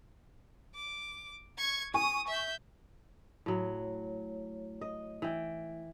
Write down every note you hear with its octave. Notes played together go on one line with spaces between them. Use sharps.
D6
C#6 G#6
G#5 C#6 D#6
E5 G6
A2 F#3
D#5
E3 G5